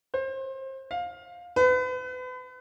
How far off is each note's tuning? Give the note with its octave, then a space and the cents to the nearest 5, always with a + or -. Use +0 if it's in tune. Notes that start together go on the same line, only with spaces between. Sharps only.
C5 +30
F5 +15
B4 +35